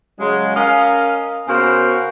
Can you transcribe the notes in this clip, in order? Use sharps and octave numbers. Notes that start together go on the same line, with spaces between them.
C#3 F#3 G#3
C#4 A#4 D#5 F5
C#3 B3 F#4 A#4 C5